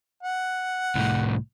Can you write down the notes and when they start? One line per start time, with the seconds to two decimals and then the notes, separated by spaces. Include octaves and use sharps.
0.23 F#5
0.95 C2 A2